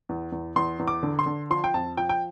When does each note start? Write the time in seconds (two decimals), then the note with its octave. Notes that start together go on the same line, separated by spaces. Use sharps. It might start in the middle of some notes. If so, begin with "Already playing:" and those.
0.09 E2
0.32 E2
0.56 E2 C6
0.79 E2
0.88 D6
1.03 D3
1.19 C6
1.26 D3
1.50 F3 C6
1.64 G5
1.74 F2 A5
1.97 F3 G5
2.09 G5